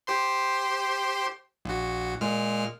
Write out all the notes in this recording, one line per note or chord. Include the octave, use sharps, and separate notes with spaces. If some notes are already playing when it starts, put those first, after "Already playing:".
G4 C5 C6
A#1 F#4
A#2 G#3 F6